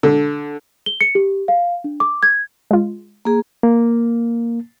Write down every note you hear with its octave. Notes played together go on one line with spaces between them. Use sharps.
D3
G7
C#7
G4
F5
D4
D6
G#6
G#3 F4
A#3 G#4
A#3